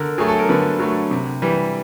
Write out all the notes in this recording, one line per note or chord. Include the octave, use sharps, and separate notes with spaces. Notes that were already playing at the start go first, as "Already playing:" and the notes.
Already playing: D3 A#4
F#3 A3 G#4
A4
A#4
D3 B4
F#3 A3
C3
E3 G3